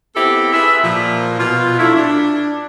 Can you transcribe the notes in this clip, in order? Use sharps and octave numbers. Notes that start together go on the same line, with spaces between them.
B3 C4 E4 G4 A4
F4 G#4 B4 E5
A#2 F3
B2 F4
F#3 A3 D4 E4
D4